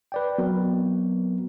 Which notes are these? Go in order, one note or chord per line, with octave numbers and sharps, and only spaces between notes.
B4 D5 G5
F#3 B3 C4 F#4 A#4